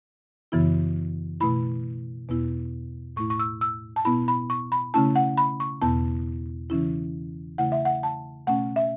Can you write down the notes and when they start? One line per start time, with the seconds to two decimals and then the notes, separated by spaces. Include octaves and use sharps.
0.52 F#2 C#3 E3 B3 E4
1.40 B2 A3 E4 B5
2.29 E2 B2 B3 E4
3.16 A2 A3 E4 C#6
3.30 C#6
3.39 E6
3.61 E6
3.96 A5
4.05 B2 B3 E4 B5
4.28 B5
4.50 C#6
4.72 B5
4.94 C#3 A3 C#4 E4 A5
5.16 F#5
5.37 B5
5.60 C#6
5.82 E2 B2 B3 E4 A5
6.70 C#3 E3 C#4 E4
7.58 C#3 A3 E4 F#5
7.72 E5
7.85 F#5
8.03 A5
8.47 B2 A3 C#4 F#5
8.76 E5